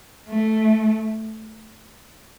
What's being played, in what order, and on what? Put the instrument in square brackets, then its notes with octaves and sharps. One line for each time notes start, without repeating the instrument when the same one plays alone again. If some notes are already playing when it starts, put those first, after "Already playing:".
[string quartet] A3